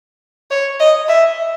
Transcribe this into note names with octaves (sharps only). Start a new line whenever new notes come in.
C#5
D#5
E5